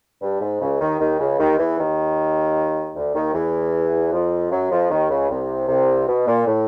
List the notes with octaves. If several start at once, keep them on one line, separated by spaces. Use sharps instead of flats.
G2
G#2
C#2 C#3
D#2 D#3
D#2 D#3
C#2 C#3
D#2 D#3
E2 E3
D#2 D#3
D2 D3
D#2 D#3
E2 E3
F2 F3
F#2 F#3
F2 F3
D#2 D#3
C#2 C#3
C2 C3
C2 C3
B2
A#2
A2